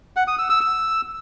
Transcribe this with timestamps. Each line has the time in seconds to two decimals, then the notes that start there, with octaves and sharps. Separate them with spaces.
0.16 F#5
0.27 D#6
0.39 E6
0.50 E6
0.61 E6